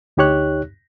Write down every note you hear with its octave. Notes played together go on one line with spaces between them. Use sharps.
D2 D#4 G4 C#5 F#6